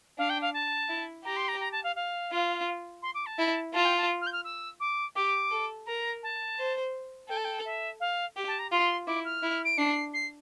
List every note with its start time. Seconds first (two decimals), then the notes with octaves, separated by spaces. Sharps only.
0.18 D4 F5
0.30 G5
0.42 F5
0.54 A5
0.89 E4
1.25 G4 A#5
1.37 C6
1.48 A#5
1.60 A#5
1.72 A5
1.84 F5
1.96 F5
2.32 F4
3.02 C6
3.14 D6
3.26 A5
3.39 E4
3.74 F4 A5
3.85 G5
3.97 A5
4.21 F6
4.27 G6
4.33 F6
4.44 E6
4.80 D6
5.16 G4 D6
5.51 A4
5.86 A#4 A#5
6.23 A5
6.58 C5
7.29 A4 G5
7.37 A5
7.45 G5
7.65 E5
8.00 F5
8.36 G4
8.48 A5
8.59 A#5
8.71 F4 C6
9.07 E4 D6
9.25 F6
9.43 E4
9.65 D7
9.78 D4 C7
10.14 C7